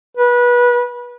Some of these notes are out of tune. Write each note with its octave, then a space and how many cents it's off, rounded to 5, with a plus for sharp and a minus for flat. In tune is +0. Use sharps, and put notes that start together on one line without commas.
B4 -25